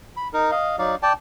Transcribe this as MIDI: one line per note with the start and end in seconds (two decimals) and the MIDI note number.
0.17 0.28 83
0.33 0.51 63
0.33 0.51 70
0.51 0.76 75
0.51 0.76 77
0.79 0.95 54
0.79 0.95 63
0.79 0.95 74
0.79 0.95 77
1.03 1.13 74
1.03 1.13 79
1.03 1.13 81